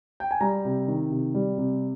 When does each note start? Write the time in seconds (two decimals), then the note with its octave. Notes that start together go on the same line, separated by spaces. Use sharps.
0.20 G5
0.31 G#5
0.41 G3 A#5
0.65 C3
0.88 D#3
1.11 C3
1.34 G3
1.58 C3